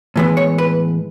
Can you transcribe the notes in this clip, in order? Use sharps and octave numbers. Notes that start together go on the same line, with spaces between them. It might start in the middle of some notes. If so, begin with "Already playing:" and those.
A2 E3 G#3 B3
C#5
B4